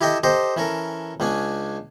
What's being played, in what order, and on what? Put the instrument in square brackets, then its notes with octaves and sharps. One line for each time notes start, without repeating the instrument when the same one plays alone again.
[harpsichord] E4 G4 A4 D#5 E5 G5
G4 A4 C5 D#5
E3 C#4 A4 A#4
C#2 C#4 D4 G#5